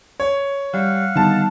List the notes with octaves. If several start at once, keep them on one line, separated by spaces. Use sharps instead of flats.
C#5
G3 F5 F#5
D3 D#3 G3 B3 A5